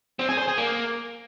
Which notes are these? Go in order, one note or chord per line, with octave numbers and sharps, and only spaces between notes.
C4
G#4
C5
G#4
A#3